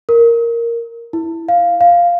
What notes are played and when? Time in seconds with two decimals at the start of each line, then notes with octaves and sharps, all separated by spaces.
0.09 A#4
1.13 E4
1.49 F5
1.81 F5